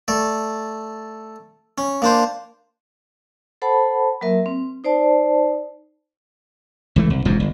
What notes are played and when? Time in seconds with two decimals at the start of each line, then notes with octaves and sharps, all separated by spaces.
0.08 A3 D5
1.78 C#4
2.02 A#3 D4 C5
3.62 A4 C5 F#5 A5 B5
4.21 F#3 A#3 A#4 E5
4.46 C4
4.84 D#4 C5 D5 A5
6.96 C#2 E3 A3
7.10 C2
7.25 E1 C#2 G#2 F3
7.40 G1